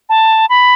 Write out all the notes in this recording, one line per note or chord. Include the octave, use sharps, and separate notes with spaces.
A5
B5